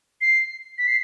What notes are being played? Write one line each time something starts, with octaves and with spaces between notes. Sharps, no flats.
C7
B6
C7